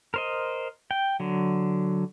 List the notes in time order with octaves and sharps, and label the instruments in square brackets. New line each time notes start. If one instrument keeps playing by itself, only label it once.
[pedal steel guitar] A#4 C5 D#5
G5
D3 F#3